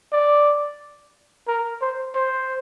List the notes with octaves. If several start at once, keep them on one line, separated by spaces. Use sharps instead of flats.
D5
A#4
C5
C5